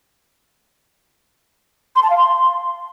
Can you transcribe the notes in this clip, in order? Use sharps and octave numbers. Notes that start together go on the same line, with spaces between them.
C6
A5
F5
C6